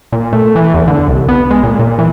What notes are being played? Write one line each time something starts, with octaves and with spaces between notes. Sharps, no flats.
A#2
A3
E3
E2
D3
C2
B3
G#3
A#2
A#2
E3